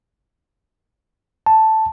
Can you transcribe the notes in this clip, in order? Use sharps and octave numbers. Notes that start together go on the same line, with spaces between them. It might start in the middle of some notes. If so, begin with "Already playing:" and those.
A5